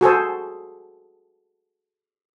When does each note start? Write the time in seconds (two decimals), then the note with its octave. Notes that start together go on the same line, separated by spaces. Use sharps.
0.01 F#4 G#4 A4 C5